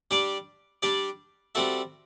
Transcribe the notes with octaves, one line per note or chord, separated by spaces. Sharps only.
G3 D4 G4 D5
G3 D4 G4 D5
G3 C4 F#4 A4 E5